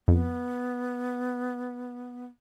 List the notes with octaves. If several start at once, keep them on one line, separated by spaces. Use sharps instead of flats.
F2 B3